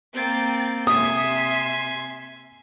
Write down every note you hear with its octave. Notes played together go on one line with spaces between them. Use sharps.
A#3 C4 G5 A6
C3 E5 G#5 C6 D#6